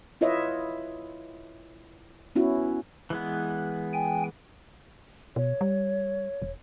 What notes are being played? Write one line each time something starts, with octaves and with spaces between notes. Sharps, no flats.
E4 F4 B4 C#5 D#5 E5
B3 C#4 E4 F#4
E3 G#3 B3 F#6
G5 G#5
B2 C#5
G3
E1